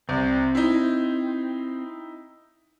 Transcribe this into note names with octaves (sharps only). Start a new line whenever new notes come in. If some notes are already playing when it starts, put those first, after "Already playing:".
C2 C4
D#4 E4